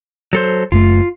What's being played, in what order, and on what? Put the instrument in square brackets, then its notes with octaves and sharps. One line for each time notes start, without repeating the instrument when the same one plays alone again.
[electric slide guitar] F#3 A4 C5
[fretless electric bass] F#1 F#2 A3 [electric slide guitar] F4